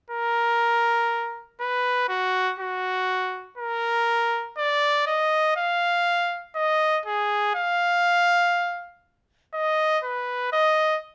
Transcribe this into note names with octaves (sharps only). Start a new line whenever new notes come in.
A#4
B4
F#4
F#4
A#4
D5
D#5
F5
D#5
G#4
F5
D#5
B4
D#5